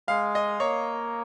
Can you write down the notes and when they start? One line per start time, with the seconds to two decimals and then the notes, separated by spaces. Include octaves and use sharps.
0.08 G#3 F5
0.35 D#5
0.60 A#3 C#5